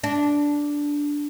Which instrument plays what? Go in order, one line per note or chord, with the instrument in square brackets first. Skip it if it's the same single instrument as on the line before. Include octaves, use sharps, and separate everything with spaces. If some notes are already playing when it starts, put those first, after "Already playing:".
[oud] D4